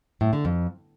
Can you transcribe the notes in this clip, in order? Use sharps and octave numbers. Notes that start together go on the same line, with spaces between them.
A2
D3
F2